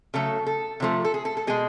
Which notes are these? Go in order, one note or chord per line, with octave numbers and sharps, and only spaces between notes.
C#3 F#3 A3 A4
A4
C3 F3 A3
A4
G#4
A4
A4
B2 G#3 G#4